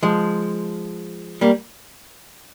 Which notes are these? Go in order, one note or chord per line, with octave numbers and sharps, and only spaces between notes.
F3 G#3
G3 A#3